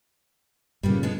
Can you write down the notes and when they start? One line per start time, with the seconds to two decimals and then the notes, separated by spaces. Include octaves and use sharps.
0.83 G2 A#2 C#3 G3 A#3 B3
1.03 D3 G#3 B3